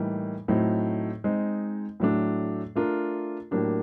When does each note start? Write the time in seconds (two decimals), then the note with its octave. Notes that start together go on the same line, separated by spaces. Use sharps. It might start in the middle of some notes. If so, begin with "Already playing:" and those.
Already playing: A2 E3 G3 A#3 D#4
0.48 A2 F#3 A3 C4 D#4
1.24 G#3 C4 D#4
2.00 A2 F#3 A3 D4
2.75 A3 D4 F4 A#4
3.51 A2 F#3 A#3 D4 G4